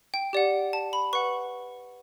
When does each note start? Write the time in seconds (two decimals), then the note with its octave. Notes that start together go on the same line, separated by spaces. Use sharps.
0.14 G5
0.33 G4 D5 F#5
0.73 A5
0.93 B5
1.13 B4 F#5 C#6